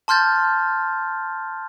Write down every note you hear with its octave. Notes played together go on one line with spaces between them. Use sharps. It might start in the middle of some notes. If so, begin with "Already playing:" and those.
A5 C6 F6 G6 A6